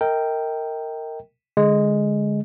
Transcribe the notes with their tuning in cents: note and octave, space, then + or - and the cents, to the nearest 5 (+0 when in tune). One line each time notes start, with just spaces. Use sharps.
A#4 -20 D#5 +30 G5 +0
D3 +0 G#3 +0